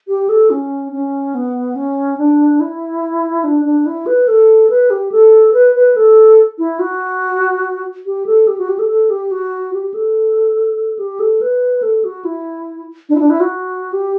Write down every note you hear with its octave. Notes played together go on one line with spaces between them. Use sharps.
G4
A4
C#4
C#4
B3
C#4
D4
E4
D4
D4
E4
B4
A4
B4
G4
A4
B4
B4
A4
E4
F#4
G4
A4
G4
F#4
G4
A4
A4
G4
F#4
G4
A4
G4
A4
B4
A4
F#4
E4
D4
E4
D4
E4
F#4
G4